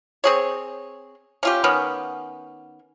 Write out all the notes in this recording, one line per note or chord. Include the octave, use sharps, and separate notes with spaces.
C4 G#4 C#5
C#4 F4 G4
D#3 B3 C#4